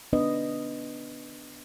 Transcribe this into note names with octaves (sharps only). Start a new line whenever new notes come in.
B3 D4 B4 D#5